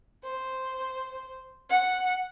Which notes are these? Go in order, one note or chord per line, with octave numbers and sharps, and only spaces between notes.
C5
F#5